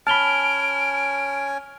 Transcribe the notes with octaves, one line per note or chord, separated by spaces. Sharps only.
C#4 G#5 A5 B5 F6 D7 F7 G7